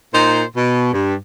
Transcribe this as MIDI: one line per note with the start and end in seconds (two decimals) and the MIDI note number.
0.13 0.43 46
0.13 0.43 63
0.13 0.43 72
0.56 0.90 47
0.93 1.15 43